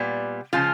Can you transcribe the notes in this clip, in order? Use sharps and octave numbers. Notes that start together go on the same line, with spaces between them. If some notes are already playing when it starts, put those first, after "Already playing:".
Already playing: A#2 G3 B3
C#3 F3 G#3 F4